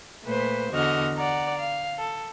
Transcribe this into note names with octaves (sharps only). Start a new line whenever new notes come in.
A#2 A3 B4 C5
E2 D3 F#4 D#5 F6
D5 F#5 A#5
F5
A4